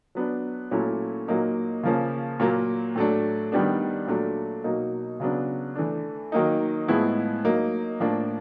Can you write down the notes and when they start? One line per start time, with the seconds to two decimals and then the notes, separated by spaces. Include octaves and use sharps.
0.15 F#3 B3 D4
0.71 A#2 F#3 A3 C#4 E4
1.28 A#2 F#3 A#3 D#4
1.83 C#3 F3 A#3 C#4
2.40 A#2 F#3 A#3
2.96 A2 F#3 A3 D4
3.52 D#3 G3 B3 D4
4.07 A#2 F#3 A3 D4
4.64 B2 F#3 A#3 D#4
5.20 C#3 F#3 B3 D4
5.76 E3 A3 D4
6.32 D#3 F#3 A#3 D#4
6.88 A2 F3 G#3 B3 E4
7.44 F#3 A#3 D#4
8.00 A2 F3 A#3 D4